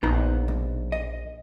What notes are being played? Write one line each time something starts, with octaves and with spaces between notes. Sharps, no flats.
A#1 B3 D#4 A#5
B1
D#5